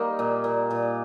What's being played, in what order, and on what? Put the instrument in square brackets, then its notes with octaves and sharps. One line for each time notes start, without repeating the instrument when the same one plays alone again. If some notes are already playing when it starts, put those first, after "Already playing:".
Already playing: [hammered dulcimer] D#3 G3 A#3 D#4
A#2
A#2
A#2